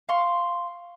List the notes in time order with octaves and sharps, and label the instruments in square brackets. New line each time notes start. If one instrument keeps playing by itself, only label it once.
[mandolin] F5 C6 C#6